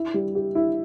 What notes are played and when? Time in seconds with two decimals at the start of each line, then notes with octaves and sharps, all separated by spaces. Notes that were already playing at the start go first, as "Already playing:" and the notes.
Already playing: E4
0.14 G3
0.35 G4
0.55 E4